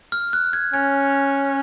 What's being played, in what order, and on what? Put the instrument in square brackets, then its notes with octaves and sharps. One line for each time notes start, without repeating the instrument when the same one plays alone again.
[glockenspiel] F6
F#6
G#6
[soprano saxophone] C#4 [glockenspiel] G#6